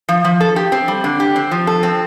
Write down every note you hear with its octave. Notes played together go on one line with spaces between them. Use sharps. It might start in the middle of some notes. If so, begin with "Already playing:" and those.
F3
F3
A4
G4
C4
G3
D3
G4
C4
F3
A4
C4